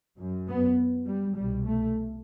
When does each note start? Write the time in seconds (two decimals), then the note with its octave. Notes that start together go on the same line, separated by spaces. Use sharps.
0.19 F#2
0.48 B3
1.07 G3
1.36 C2 B2 G3
1.66 A3